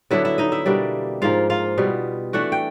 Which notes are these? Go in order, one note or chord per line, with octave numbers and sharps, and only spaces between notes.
D3 F#3 B3 D4 E4 E5
E4 E5
D#4 D#5
E4 E5
B2 G3 A#3 D4
G#2 F3 A#3 F4 F5
F4 F5
B2 G3 B3
E3 A3 D4 F#4 F#5
G5